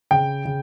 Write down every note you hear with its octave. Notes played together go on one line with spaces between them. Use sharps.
C#3 G5
C#3